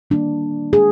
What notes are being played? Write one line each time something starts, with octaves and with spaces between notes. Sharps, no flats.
D#3 G3 A#3 D4
G#4